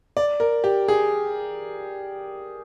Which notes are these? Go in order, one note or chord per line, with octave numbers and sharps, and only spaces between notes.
D5
A#4
G4
G#4